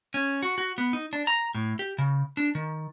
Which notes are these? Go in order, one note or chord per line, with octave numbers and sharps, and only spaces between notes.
C#4
F#4
F#4
B3
D#4
D4
A#5
A2
G4
C#3
D4
D#3